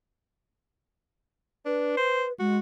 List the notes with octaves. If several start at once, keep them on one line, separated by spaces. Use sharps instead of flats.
D4 B4
C5
G#3 F#4